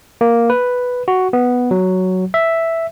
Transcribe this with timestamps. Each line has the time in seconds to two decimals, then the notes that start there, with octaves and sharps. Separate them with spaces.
0.21 A#3
0.50 B4
1.08 F#4
1.33 B3
1.71 F#3
2.34 E5